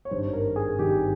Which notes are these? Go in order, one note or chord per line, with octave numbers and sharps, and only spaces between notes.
C#5
G#1 G2 D#3 C5
A#4
G#4
G#1 G2 D#3 G4